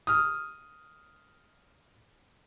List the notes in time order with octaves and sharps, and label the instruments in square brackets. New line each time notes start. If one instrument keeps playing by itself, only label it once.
[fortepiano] D#6 F6